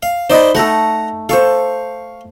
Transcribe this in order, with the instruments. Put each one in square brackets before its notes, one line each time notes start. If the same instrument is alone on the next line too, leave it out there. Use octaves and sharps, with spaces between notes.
[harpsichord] F5
[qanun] D#4 B5 [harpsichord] C5 D5 D#5
[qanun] A3 A4 [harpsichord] F#5 A#5
[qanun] A4 C5 [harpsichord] F5 C#6